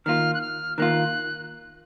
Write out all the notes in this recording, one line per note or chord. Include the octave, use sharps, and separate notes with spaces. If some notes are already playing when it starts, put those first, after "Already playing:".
D#3 A#3 F4 F6
F#6
F6
D#3 A#3 F4 F#6